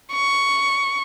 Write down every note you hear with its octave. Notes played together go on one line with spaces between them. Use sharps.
C#6